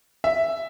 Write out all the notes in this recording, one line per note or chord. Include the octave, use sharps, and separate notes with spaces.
E5